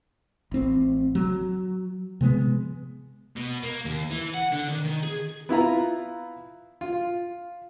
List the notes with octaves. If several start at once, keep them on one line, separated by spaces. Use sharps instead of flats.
A1 C4
F#3
C3 F3 G#3 B3
B2
A#3
D#2
E3
F#5
D3
D#3
D#3
G#4
B3 E4 F4 A#5
F4